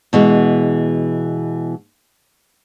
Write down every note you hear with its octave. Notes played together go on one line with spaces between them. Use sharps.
B2 E3 G#3